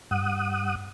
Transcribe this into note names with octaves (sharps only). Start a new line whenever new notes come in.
G2 F#5 D#6